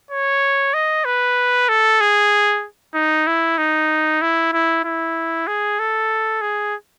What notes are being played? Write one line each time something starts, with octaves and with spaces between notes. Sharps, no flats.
C#5
D#5
B4
A4
G#4
D#4
E4
D#4
E4
E4
E4
G#4
A4
G#4